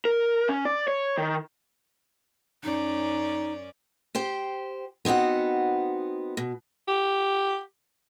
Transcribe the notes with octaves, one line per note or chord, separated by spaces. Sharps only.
A#4
C#4
D5
C#5
D#3
F#2 C#4 D#4 D5
G4 C5 G5
B3 C4 D#4 F#4 F#5
B2
G4